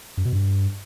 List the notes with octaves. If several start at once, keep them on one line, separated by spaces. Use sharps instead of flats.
F#2
B2
G2